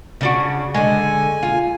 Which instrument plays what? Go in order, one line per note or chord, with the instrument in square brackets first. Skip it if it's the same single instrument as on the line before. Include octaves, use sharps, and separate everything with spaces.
[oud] C#3 D4 F#4
[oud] D3 G#3 [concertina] G#5
[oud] F4